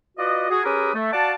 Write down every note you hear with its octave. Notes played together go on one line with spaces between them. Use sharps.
F4 F#4 B4 D5 D#5
F#4 G#4
C#4 G4 G#4 A#4 B4 D#6
A3
F#4 D5 F5 F#5 A5